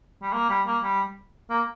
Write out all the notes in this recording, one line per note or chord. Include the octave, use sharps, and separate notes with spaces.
G3
A#3
G3
A#3
G3
A#3